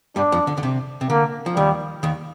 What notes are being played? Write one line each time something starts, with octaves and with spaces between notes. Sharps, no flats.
G2 G3 D4
F2 F3
D3
D3
C3
C3
D3 A#3
F3
D#2 D#3 G3
D#2 D#3